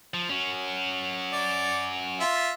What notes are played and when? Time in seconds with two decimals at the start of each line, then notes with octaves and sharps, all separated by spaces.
0.14 F3
0.29 C#4 F#4
1.31 D5
2.20 F4 E5